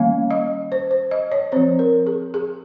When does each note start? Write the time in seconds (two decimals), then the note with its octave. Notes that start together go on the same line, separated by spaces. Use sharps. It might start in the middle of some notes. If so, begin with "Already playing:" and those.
Already playing: D#3 G3 A#3 C#4 F5
0.31 D#5
0.72 C5
0.91 C5
1.11 D#5
1.32 C#5
1.52 F3 C4 C5
1.79 A#4
2.07 G#4
2.34 G#4